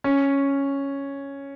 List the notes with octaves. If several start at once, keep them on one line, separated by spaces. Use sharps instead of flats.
C#4